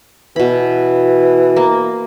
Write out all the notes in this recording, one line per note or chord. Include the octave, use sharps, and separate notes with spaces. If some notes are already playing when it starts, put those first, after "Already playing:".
B2 E3 B5
A#3